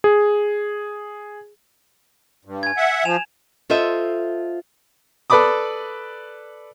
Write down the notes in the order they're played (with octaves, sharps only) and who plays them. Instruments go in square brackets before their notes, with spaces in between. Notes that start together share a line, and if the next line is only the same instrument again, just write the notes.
[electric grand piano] G#4
[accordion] G2
[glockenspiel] G#5 G#6
[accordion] E5 F#5
[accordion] F3 [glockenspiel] G#5 E7 F7
[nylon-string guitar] F4 A4 C5 D#5 E5
[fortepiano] A4 B4 D5 B5 D6 D#6